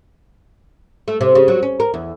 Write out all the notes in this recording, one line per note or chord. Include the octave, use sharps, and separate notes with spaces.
A3
C3
C#3
F#3
C#4
A#4
E2